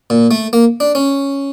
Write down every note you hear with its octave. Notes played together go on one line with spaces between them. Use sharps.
A#2
A3
A#3
D4
C#4